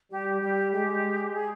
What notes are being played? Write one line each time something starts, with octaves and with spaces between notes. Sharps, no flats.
G3 G4
G3 G4
G#3 G4
G#4